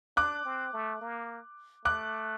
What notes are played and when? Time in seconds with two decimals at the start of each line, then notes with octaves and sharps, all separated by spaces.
0.17 D4 D6 F#6
0.45 C4
0.73 A3
1.02 A#3
1.85 A3 D6 F#6